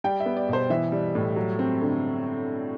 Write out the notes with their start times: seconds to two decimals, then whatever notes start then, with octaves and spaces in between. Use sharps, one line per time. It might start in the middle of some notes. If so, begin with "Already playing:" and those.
0.04 G3 G5
0.20 E5
0.26 B3
0.37 D5
0.49 B2 C5
0.70 E3 E5
0.92 G3
1.15 A2
1.36 F#3
1.59 C4
1.81 D3